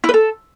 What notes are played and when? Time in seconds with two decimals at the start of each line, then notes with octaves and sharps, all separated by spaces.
0.04 E4
0.09 B4
0.14 A4